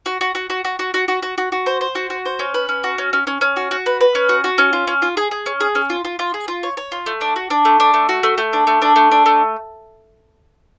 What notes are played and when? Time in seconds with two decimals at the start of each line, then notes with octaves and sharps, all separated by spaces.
0.06 F#4
0.21 F#4
0.35 F#4
0.50 F#4
0.65 F#4
0.79 F#4
0.94 F#4
1.08 F#4
1.23 F#4
1.38 F#4
1.52 F#4
1.66 C5
1.81 C5
1.95 F#4
2.10 F#4
2.26 C5
2.39 C#4
2.54 B4
2.69 C#4
2.84 F#4
2.98 C#4
3.13 C#4
3.27 C#4
3.41 C#4
3.56 F#4
3.71 F#4
3.86 B4
4.01 B4
4.15 C#4
4.29 F#4
4.44 F#4
4.58 C#4
4.73 F4
4.87 C#4
5.02 F4
5.17 G#4
5.31 G#4
5.46 C#4
5.60 G#4
5.75 C#4
5.90 F4
6.05 F4
6.19 F4
6.34 G#4
6.48 F4
6.63 C#5
6.77 C#5
6.92 F4
7.06 A3
7.21 D4
7.36 F#4
7.50 D4
7.65 A3
7.80 D4
7.94 A3
8.09 F#4
8.23 A3
8.38 A3
8.53 D4
8.67 A3
8.82 D4
8.96 A3
9.11 D4
9.26 A3